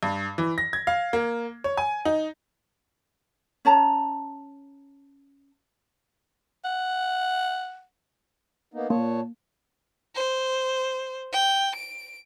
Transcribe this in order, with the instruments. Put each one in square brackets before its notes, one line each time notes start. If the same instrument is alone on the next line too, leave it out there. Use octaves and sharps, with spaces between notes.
[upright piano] G2
E3
A#6
G#6
F5
A#3
C#5
G#5
D#4
[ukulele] C#4 C#5 A5 A#5
[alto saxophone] F#5
[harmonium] A#3 B3 D#4
[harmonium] A#2 C#5 A5 [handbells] A#3
[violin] C5
G5
D7